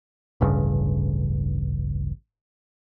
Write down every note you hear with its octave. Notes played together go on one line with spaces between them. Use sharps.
D1 A1 G2 C#3